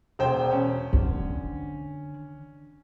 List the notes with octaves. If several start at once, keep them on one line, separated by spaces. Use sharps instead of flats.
E1 C5 G5
C#4
D3